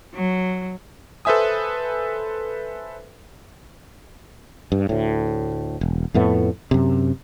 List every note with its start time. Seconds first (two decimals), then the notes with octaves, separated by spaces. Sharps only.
0.14 F#3
1.25 A4 B4 C5 E5 G#5 D#6
4.72 G2
4.89 D2 A2
5.81 E1
6.14 F2 A2 A3 B3
6.71 F#2 C3